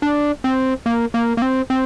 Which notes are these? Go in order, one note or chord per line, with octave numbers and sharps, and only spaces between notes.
D4
C4
A#3
A#3
A#3
C4
C4